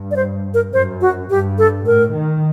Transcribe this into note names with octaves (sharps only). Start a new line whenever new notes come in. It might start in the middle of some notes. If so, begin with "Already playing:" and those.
Already playing: G2
D5
C5
A#4
F#2 C5
F#4
G2 G4
A4
A2 A#4
D#3